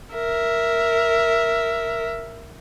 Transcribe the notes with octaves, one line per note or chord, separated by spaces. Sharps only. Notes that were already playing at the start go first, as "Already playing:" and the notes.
A#4 E5